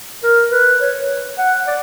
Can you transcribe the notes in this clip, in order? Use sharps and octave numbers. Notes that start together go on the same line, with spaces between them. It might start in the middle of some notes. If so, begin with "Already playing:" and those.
A#4
B4
C#5
F#5
D5